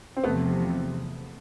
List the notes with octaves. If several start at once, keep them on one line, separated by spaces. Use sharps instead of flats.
C4
E2 C3 F3 A3 B3